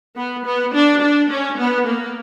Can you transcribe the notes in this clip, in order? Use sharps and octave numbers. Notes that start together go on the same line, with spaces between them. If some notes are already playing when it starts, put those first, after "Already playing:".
B3
B3
D4
D4
C#4
B3
A#3